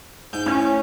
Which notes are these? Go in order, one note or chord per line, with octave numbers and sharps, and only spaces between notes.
G#2 G6
A2 C#4